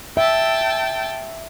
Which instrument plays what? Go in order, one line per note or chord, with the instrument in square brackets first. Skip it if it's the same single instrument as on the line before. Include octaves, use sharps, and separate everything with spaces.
[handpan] E5 [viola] G5 A5